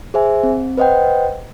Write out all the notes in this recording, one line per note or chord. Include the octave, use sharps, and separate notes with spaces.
G#4 C5 E5 G#5
C4
B4 C5 D#5 F#5 G5